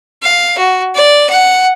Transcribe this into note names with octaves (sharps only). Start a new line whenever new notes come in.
F5
F#4
D5
F#5